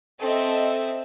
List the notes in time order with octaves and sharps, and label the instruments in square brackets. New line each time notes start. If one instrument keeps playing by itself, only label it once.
[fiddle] C4 E5 [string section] A4 D#5